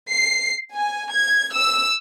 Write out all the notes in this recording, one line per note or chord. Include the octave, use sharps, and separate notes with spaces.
C7
G#5
G#6
E6